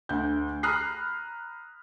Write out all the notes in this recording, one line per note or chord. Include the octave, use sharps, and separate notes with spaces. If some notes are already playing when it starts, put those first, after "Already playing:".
D2 G6
A#5 B5 D#6 F6 F#6 C7